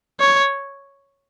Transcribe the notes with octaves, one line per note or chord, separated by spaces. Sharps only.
C#5